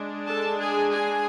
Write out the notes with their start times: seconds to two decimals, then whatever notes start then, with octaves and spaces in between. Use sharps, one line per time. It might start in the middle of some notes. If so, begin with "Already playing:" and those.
Already playing: G#3 D4
0.28 A4 A5
0.60 G#4 G#5
0.93 G#4 G#5